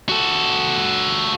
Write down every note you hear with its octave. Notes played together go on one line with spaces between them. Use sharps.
F#4 A4